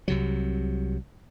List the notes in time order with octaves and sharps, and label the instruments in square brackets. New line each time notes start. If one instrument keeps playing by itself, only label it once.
[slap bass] C2 C3 F#3